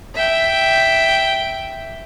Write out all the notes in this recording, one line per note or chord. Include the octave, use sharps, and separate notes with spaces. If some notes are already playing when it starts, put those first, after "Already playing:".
E5 G5